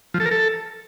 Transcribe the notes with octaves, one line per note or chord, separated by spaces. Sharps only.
F3
A4
A#4
A4